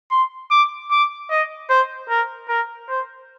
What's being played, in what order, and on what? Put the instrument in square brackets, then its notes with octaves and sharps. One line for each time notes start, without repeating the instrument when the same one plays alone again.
[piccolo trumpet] C6
D6
D6
D#5
C5
A#4
A#4
C5